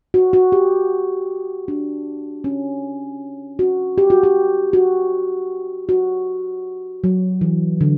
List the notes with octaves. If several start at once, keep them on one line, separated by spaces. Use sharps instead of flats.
F#4
F#4
G4
D4
C#4
F#4
G4
F#4
G4
F#4
F#4
F#3
E3
D3